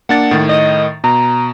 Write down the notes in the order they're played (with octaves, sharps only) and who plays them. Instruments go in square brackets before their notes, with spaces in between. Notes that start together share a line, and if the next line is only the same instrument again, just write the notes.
[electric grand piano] A#3 D4 A6 [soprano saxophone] F#5
[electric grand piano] A2 D#3
[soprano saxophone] D#5
[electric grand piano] B2 [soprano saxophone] A#5